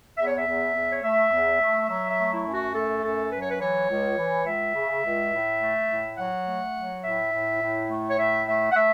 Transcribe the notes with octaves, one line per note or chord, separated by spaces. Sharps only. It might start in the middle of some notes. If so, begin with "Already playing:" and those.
E2 E5
C#5
E5
E2
E2
C#5
A3 E5
E2
A3
F#3 E5
E5
A3
E4
F#2
F#4
A3 A4
F#2 A4
F#3 B4
C#5
B4
E3 C#5
C#2
E3
C#2 E5
C#3
C#2
A2
A3
A2
F#3 F#5
A3
F#3
A2 E5
A2
A2
A3
C#5
A2 E5
A3 E5
F#5
A3 E5